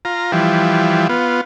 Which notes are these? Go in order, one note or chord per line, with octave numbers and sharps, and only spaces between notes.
F4 A#5
E3 F3 G3
B3 F4